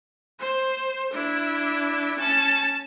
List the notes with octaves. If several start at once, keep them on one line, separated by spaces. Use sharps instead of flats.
C5
D4 E4
C#4 A5